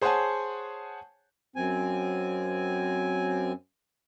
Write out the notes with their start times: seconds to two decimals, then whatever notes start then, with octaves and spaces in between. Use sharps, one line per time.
0.02 G#4 C5 C#5 F#5 G#5 A5
1.56 F#2 C4 G#5